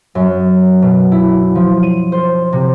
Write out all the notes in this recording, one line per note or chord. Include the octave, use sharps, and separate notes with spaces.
F#2
B2
E4
F3
D#7
C5
C3